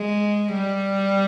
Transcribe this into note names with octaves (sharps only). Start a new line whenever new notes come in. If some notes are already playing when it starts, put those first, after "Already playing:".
Already playing: G#3
G3